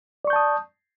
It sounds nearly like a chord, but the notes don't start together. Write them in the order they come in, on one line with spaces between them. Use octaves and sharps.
D5 C#6 G6 A5 D#6